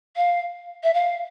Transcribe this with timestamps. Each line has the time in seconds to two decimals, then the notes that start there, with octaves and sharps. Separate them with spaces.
0.16 F5
0.83 E5
0.93 F5